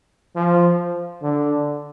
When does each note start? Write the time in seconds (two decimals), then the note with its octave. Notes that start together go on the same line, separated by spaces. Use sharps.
0.36 F3
1.22 D3